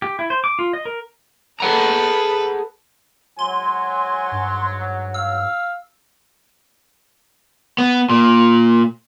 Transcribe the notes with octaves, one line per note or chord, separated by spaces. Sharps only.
G4
E4
C5
D6
F4
D#5
A#4
G#4 A4 B4 F#5 A#5
G#2 F#3 G#5 C6
G2
F5 E6
B3
A#2